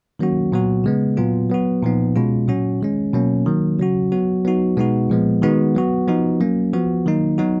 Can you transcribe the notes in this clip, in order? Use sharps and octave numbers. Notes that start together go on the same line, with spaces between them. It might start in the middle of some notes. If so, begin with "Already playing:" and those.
D#3 F#3 A#3 C#4 F#4
A#2 F#3 B3 F#4
C#3 G#3 B3
A#2 F#3 B3 F4
F#3 B3 F#4
A#2 F3 B3 D#4
B2 G#3 C#4 F4
A#2 F#3 C#4 F#4
D#3 G#3 C#4
B2 F#3 A#3 C#4
D#3 F#3 A#3
C#3 F#3 C#4 F#4
F#3 B3 F#4
F#3 B3 D#4 F#4
B2 G#3 B3 D#4 F#4
A#2 F3 G#3 B3
D#3 G#3 B3 D#4 F#4
F#3 B3 F#4
F3 B3 D#4 F#4
F#3 A#3 C#4
F3 B3 F#4
D#3 F#3 A#3 D#4
F#3 B3 D#4 F#4